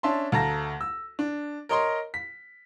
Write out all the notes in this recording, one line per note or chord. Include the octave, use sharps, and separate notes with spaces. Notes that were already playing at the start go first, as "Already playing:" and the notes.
C#4 D4 E5 A5 C6
D2 F5 A5 A#5 A#6
E6
D4
A#4 C#5 D#5 A#5 C6
B6